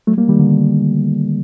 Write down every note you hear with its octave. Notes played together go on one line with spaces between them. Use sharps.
F#3 A3
G3 A#3
D#3 G3
D3